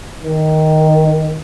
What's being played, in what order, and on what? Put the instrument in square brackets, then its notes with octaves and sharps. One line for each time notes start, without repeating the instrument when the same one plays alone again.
[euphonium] D#3